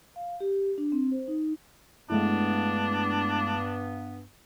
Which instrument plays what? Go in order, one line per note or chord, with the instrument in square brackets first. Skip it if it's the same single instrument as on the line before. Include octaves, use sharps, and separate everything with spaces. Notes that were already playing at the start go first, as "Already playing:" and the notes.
[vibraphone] F5
G4
D4
C4
C5
D#4
[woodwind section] G2 B3 [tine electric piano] G#3 A3 E4 [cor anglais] D4